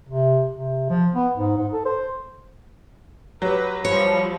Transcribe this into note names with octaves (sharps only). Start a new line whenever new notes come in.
C3
C3
F3
B3
G#2
G#2
A4
C5
F#3 G4 B4
F3 G3 C#5 B5